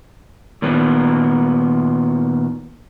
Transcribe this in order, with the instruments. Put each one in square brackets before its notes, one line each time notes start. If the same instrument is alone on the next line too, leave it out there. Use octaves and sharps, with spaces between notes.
[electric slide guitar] A#2 D#3 B3